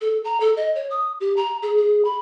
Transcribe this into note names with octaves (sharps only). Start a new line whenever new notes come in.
A4
A#5
A4
D#5
C#5
D#6
G4
A#5
G#4
G#4
B5